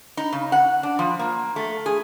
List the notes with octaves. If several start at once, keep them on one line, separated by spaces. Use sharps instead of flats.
D#4
C#3
F#5
D4
F3
A#3
A3
G#4